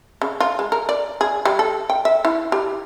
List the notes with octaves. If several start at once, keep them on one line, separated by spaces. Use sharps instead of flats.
C#3
F4
G#3
A#4
D5
G#4
G3
A4
G5
E5
E4
G4